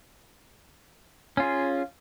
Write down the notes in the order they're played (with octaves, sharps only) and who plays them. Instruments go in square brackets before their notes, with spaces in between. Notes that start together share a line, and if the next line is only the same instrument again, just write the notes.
[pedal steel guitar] C#4
F4
G#4